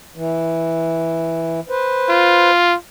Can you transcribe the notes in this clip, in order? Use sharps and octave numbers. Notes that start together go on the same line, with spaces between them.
E3
B4 C5
F4